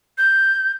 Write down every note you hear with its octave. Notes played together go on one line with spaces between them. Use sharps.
G6